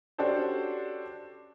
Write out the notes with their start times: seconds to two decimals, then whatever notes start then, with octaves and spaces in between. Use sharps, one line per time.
0.18 C#4 D4 F#4 G4 A4 C5